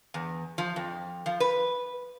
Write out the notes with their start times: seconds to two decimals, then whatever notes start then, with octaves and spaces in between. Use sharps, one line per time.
0.14 E2
0.58 F3
0.76 F2
1.26 F3
1.40 B4